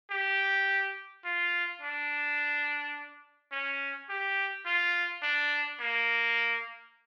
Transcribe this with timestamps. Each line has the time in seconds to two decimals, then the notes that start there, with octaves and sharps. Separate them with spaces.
0.11 G4
1.25 F4
1.82 D4
3.52 C#4
4.09 G4
4.66 F4
5.23 D4
5.80 A#3